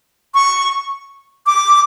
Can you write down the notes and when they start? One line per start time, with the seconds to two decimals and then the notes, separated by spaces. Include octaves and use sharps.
0.34 C#6
1.46 D6